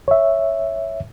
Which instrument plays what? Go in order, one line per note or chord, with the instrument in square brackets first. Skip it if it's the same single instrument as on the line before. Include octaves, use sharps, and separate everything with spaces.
[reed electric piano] C#5 E5